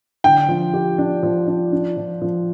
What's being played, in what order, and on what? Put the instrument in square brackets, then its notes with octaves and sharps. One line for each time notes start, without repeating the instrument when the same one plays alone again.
[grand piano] D3 [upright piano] G5
[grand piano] F3
G4
D4
F3
D4
D4
F3
F3